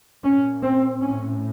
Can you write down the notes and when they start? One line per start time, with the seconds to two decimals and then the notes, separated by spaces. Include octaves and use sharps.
0.24 A#2 C#4
0.62 C4
1.00 A2 C#4